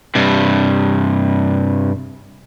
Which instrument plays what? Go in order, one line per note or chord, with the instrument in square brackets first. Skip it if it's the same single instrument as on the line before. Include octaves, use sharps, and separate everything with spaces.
[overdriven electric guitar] G2 C3